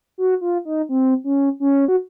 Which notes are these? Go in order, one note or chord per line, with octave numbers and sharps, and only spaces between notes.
F#4
F4
D#4
C4
C#4
C#4
F#4